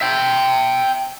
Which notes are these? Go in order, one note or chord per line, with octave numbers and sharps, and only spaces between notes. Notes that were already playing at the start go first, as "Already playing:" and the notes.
E5 G5